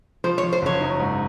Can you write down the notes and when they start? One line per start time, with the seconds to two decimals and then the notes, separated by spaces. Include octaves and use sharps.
0.24 F3 C5
0.38 C#5
0.43 F3
0.53 C5
0.62 F#1 C#5
0.81 D#4
0.99 G#2